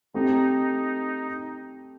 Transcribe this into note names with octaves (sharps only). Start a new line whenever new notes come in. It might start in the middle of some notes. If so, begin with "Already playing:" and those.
A3 C4 D#4 G4